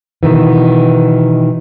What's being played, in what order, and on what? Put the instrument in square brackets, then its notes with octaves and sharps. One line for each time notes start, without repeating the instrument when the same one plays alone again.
[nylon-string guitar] B2 D#3 E3